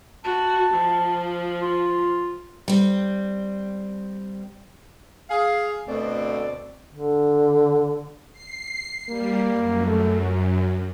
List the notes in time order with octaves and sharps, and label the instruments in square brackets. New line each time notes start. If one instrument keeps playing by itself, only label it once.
[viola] F#4 [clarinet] A5
[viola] F3
[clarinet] F4
[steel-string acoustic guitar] G3 C4
[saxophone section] G#4 F5
D2 B2 A3 C4 D5
[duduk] D3
[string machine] C7
[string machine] G3 [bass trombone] A#3
[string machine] F#2
[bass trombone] A3
F#3